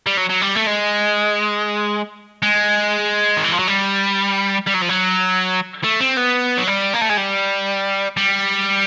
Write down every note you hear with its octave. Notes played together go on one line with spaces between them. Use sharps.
G3
F#3
F#3
G3
A3
G#3
G#3
D#3
E3
F3
F#3
G3
G3
F#3
F3
F#3
A3
C4
B3
F#3
G3
A#3
A3
G#3
G3
G3